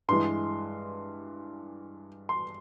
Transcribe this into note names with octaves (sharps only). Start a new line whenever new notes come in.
G2 E3 G#3 C6
C6